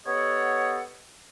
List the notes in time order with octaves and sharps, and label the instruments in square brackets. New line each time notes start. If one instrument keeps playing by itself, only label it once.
[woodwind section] B3 G4 A4 C#5 D#5 F#5